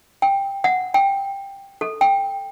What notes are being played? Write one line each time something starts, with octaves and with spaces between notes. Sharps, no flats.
G5
F#5
G5
A4
G5